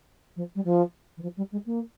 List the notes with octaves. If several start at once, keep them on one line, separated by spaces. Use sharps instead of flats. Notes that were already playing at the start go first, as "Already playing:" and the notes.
F3
G3
F3
E3
F3
G3
G#3
A#3